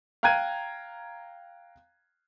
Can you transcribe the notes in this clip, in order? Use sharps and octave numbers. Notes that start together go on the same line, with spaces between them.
F5 G5 A#5 F#6 G#6 D#7